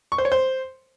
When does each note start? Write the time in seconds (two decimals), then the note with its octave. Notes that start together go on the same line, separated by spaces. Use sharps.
0.12 C#6
0.18 C5
0.25 C#5
0.32 C5